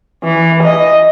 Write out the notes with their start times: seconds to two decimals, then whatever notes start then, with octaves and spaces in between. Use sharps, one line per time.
0.24 E3
0.63 D#5